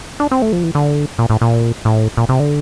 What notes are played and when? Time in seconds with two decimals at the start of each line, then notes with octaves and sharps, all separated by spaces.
0.20 D4
0.31 C4
0.42 A3
0.53 F3
0.63 E3
0.75 D3
1.19 A#2
1.30 A2
1.41 A#2
1.85 A2
2.17 A#2
2.29 C3
2.40 D3